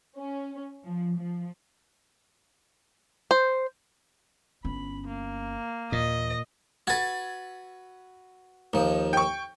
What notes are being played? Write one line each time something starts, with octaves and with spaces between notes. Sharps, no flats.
C#4
F3
F3
C5
G1 C#4 B5
A#3
D#2 A#2 E3 D#5
F#4 B4 G#6 A6
D#2 F3 D#4
G5 C#6